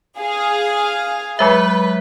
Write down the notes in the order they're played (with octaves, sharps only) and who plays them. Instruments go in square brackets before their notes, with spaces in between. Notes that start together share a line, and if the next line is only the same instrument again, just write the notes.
[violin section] G#4 F5
[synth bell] F#3 G#3 E5 [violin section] B4